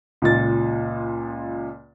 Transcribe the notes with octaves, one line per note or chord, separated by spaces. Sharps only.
C#2 A#2 A6